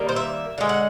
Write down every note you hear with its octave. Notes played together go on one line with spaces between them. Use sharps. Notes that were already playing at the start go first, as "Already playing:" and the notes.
Already playing: D#3 G3 A#3
C5
E5
D3 F3 G#3 F5
F#5